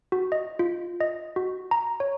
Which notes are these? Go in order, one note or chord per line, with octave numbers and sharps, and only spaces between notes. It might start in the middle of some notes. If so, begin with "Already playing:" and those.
F#4
D#5
F4
D#5
F#4
A#5
C#5